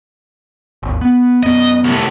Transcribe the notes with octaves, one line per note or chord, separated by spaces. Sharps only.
G#1 D#2
B3
F#2 B3 D#5
C2 A2